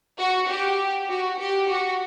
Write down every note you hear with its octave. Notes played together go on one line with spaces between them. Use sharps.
F#4
G4
F#4
G4
F#4